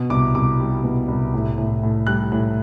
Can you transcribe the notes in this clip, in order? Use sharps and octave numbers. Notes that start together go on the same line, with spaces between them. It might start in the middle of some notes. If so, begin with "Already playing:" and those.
Already playing: B2
C2 D6
C2 D6
G3
B2
C2
A2
A2
A2
G3 F#6
A2